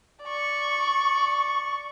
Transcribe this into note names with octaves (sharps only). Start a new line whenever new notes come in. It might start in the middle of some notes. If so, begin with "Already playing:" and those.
D5 C#6